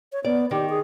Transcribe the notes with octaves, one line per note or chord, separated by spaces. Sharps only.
C#5
B3 D5
D#3 G4
G#4